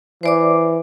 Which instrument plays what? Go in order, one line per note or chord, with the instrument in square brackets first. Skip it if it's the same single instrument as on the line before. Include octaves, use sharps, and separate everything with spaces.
[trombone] E3 [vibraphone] C5 D5 D6